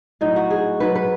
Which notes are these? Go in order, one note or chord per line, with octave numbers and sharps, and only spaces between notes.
A2 F#3 D#4
F#4
G#4
G#2 F#3 B4
B4